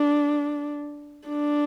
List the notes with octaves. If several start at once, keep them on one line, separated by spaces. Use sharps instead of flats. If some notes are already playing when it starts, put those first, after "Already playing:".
Already playing: D4
D4